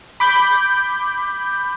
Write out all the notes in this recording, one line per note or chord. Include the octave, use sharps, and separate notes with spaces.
B5 D6 G6